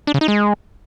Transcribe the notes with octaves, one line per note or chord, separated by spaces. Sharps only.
D4
C#3
D#4
G#3